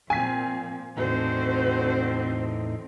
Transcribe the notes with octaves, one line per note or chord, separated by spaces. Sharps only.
A#2 F3 C4 G#5 B6
E2 A2 D3 C4 D#4 F#4 C5